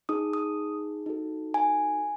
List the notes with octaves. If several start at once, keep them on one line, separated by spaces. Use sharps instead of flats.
D#4 G#4 D#6
D#6
D#4 F#4 A4
G#5